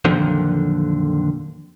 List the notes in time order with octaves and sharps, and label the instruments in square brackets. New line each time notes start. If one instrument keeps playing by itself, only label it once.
[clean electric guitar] F2 A#2 D3 D#3 F3 F#3